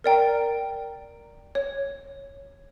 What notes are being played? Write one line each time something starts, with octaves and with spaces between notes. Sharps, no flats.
A#4 D5 G5 A#5
C#5